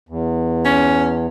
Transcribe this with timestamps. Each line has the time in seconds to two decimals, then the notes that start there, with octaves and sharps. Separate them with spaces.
0.09 E2
0.65 C#4